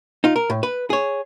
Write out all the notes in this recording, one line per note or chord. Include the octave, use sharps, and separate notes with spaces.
D#4 F4
A#4
A2
B4
G#4 C#5